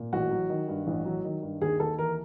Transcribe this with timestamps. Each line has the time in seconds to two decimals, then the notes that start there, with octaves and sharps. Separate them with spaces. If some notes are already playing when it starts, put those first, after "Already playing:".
Already playing: A#2
0.13 A1 F#4
0.31 F#3
0.50 D#3
0.68 G2
0.87 A1
1.05 F#3
1.25 D#3
1.42 G2
1.61 D#2 G#4
1.80 D#2 A4
1.98 E3 A#4